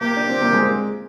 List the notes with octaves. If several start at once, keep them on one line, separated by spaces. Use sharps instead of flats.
A#3 G4
D4
C4
A#3
G#3 C4